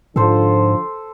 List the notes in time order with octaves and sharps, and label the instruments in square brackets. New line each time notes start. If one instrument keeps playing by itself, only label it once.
[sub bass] G#2 [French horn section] D3 F3 [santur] A4 C5